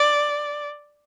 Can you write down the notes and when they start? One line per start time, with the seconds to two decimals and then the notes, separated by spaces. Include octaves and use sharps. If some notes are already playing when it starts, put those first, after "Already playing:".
Already playing: D5